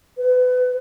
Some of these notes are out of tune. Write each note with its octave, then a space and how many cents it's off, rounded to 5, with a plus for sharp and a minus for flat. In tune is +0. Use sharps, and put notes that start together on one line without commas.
B4 +25